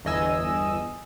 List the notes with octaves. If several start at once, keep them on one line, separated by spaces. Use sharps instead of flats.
G1 E2 D#5 G#5 E6